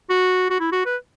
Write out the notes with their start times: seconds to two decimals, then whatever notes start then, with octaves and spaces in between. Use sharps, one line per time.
0.10 F#4
0.51 F#4
0.60 E4
0.72 F#4
0.86 B4